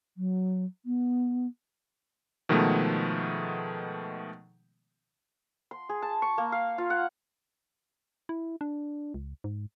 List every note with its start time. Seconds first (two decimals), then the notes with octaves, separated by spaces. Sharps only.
0.17 F#3
0.86 B3
2.49 B2 D#3 F3 G#3 A3 B3
5.71 C6
5.89 G#4
6.02 A5
6.22 C#6
6.38 A#3
6.52 F5
6.78 F4
6.90 F#5
8.29 E4
8.61 D4
9.14 C#2
9.44 G#2